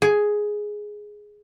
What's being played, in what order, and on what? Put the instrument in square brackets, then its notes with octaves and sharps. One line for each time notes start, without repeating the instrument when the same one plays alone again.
[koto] G#4